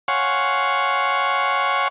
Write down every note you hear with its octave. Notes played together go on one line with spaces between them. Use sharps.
C#5 F5 F#5 G#5 C6 C#6